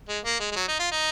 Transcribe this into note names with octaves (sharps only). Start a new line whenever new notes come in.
G#3
A#3
G#3
G#3
F#3
D#4
F4
D#4